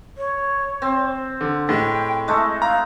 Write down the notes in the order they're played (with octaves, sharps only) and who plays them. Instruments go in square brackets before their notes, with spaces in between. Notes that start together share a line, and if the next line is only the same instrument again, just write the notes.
[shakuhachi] C#5
[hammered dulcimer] C4
[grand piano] D3
[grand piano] A2 G#3 [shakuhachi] G5
[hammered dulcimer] G#3 A3 E4 [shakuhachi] D#5
[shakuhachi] F5 [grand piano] A#5